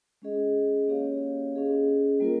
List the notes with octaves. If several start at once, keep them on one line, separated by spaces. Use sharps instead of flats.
G#3 C#4 G#4 D#5
A#3 C#4 G4 C#5 F5
C#4 G#4 D#5
G3 A#3 F4 A#4